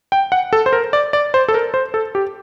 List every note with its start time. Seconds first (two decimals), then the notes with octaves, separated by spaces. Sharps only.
0.12 G5
0.32 F#5
0.53 A4
0.66 C5
0.73 A#4
0.93 D5
1.13 D5
1.34 C5
1.48 A4
1.54 A#4
1.74 C5
1.94 A4
2.15 G4